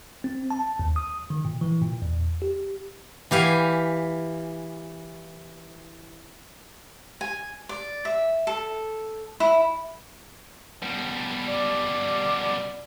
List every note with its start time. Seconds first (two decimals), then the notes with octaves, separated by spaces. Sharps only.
0.24 C4
0.51 A5
0.79 D#2
0.96 D#6
1.30 D#3
1.45 A#2
1.61 E3
1.82 A#2
2.02 E2
2.42 G4
3.31 E3 G4 F5 G#5
7.21 G#5
7.69 D5
8.05 E5
8.47 A4
9.40 E4
10.82 B2 G3
11.49 D5